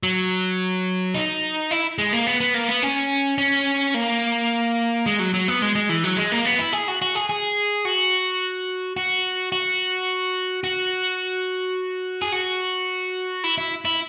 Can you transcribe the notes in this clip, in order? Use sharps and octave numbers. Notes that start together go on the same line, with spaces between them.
F#3
D#4
E4
G#3
A#3
B3
B3
A#3
B3
C#4
C#4
A#3
G#3
F#3
F#3
B3
G#3
G#3
E3
F#3
G#3
A#3
B3
E4
G#4
F#4
F#4
G#4
G#4
F#4
F#4
F#4
F#4
G#4
F#4
E4
E4
E4